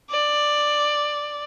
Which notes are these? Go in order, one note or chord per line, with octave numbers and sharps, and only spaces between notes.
D5